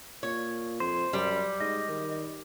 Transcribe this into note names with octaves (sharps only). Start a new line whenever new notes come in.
A#2 C#5
F2 C5
F#2 G3
G#2 D#5
D#3